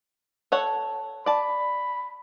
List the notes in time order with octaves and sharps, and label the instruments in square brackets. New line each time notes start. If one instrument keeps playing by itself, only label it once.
[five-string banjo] A4 C#5 F#5
[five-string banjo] D5 A5 [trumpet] B5